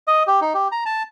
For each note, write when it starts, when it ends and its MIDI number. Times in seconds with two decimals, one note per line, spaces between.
0.08 0.23 75
0.27 0.40 67
0.41 0.53 63
0.54 0.68 67
0.72 0.84 82
0.86 1.03 81